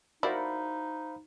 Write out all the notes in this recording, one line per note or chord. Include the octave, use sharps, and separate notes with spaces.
D#4 E4 F#4 A#4 C5 D5 F5 B5